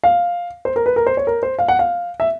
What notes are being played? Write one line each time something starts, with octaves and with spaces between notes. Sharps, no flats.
F5
C5
A#4
B4
A#4
C5
C#5
A#4
C5
F5
F#5
F5
E5